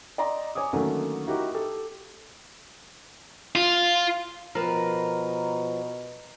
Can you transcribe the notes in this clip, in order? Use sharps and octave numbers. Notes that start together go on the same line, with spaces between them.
D5 D#5 A#5 C6
C#5 G#5 D6 D#6
D3 D#3 F#3 A3 A#3 C#4
D#4 E4 F#4 G4 A#4
G4 A4
F4
B2 F3 A#4 B4